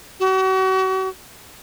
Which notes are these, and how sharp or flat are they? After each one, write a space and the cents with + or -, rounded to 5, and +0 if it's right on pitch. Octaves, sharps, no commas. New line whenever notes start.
F#4 +40